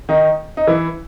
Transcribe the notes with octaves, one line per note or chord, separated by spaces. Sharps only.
D#3 D#4
D#4
E3 E4